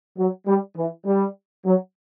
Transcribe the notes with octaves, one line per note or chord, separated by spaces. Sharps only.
F#3
G3
E3
G3
F#3